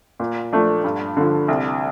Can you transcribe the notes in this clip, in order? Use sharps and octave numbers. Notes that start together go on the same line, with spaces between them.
A#2
F3 A3 D4
G2
D3 F3
C2